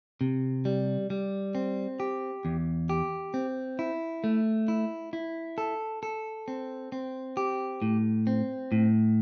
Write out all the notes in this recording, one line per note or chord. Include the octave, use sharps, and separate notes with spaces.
C3
G3
G3
C4
G4
E2
G4
C4
E4
A3
E4
E4
A4
A4
C4
C4
G4
A2
C4
A2